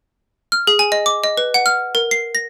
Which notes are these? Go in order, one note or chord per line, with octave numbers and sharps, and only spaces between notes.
F6
G#4
G#5
D#5
D6
D#5
B4
F#5
F6
A#4
C7
A#6